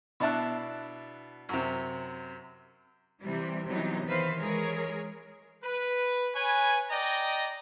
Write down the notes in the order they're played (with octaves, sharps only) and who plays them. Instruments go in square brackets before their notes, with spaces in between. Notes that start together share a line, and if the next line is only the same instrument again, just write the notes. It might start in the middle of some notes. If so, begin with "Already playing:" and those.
[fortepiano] B2 D4 E4 A5 F#6
F#2 C3
[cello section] C3 E3 G3
C3 E3 F#3 B3 D#4
D#3 E3 B4 C5 F5
E3 G#3 G#4 A#4 C#5
[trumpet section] B4
B4 C#5 G#5
D5 D#5 G5 A#5